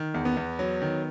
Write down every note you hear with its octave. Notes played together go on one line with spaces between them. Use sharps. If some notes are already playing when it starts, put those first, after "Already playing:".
Already playing: D#3
E2
B3
E2
F#3
D#3